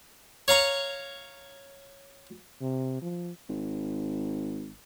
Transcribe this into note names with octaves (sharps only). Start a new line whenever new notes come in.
C#5 F5 A#5 C#6
C3
F3
G#1